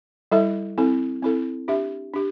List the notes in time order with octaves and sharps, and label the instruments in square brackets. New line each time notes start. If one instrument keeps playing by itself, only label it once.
[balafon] G3 E4 A4 E5
C4 E4 A4
C4 E4 A4
D4 G4 E5
D4 G4